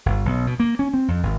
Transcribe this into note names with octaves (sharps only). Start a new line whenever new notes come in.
G1
B1
B2
A#3
C#4
C4
F2
G#1